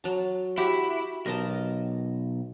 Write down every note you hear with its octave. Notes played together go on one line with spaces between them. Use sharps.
F#3 A5
E4 F#4 G4
B1 A#4 D#5 A5